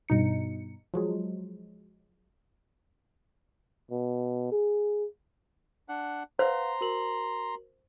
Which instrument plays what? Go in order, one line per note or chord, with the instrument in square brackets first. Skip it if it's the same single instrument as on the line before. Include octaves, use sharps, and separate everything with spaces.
[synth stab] G2 B2 D#4 C#7
F3 F#3 G#3
[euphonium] B2
G#4
[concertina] D4 F#5
[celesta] B4 F5 F#5 [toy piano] C5 [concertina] A#5 C6
[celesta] F#4 A#4 F#7